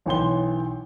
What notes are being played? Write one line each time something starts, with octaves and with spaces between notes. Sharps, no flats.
B1 E3 C#5 G5 C6 G7